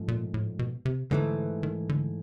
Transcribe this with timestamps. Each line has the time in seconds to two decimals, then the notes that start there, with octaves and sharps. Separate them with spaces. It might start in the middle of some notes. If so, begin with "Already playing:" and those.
Already playing: G#2 F3 A3 C#4
0.08 A#2
0.34 A2
0.59 B2
0.85 C3
1.11 G#2 D3 E3 A3
1.63 D#3
1.89 D3